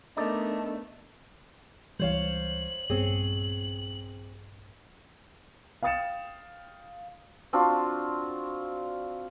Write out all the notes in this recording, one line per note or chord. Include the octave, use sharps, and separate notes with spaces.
A3 B3 D4 D#4 A#4 D5
C#2 E3 G3 C5 C#5 F5 F#7
A#1 G2 B3 C4 G#4 C#5
F5 G5 D#6 A6 C#7 E7
C4 D4 F4 F#4